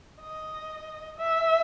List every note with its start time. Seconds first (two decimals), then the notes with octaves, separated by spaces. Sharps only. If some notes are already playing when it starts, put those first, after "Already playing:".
0.20 D#5
1.18 E5